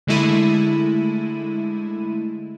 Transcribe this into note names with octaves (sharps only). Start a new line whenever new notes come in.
D3 G#3 A3 E4 D#7